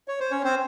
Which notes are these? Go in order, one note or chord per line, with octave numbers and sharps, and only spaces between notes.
C#5
C5
C#4 C#5
C4 C5